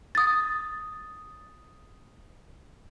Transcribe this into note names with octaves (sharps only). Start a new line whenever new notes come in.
D#6 A6